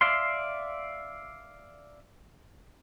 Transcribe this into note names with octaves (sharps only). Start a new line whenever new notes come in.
D5 E5 F5 C6